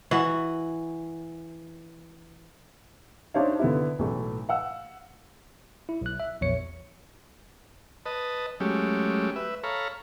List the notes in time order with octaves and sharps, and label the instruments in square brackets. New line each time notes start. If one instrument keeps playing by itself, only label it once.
[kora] E3 F#4
[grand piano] D4 D#4 C5 C#5 E5 F5
D3 B3 E4
B1 A2 E3 A3
F5 F#5 E6
[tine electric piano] E4
B1 F#6
E5
A#1 E2 C#5 C#7
[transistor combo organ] B4 D#5 A5
F#3 G#3 A3 C#4 G4
B4 E5
A4 C#5 F5 A#5 B5